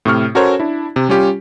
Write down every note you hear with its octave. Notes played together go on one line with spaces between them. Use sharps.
A2 C3 C#6 F6
C#4 F#4 A4 A#4 C5 C#5
D4 E4
C3
G3 C#4 F4 G4